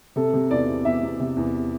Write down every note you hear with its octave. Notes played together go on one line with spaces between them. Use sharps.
C3 A4
C3
E2 D5
E2
E2 E5
E2
C3
E2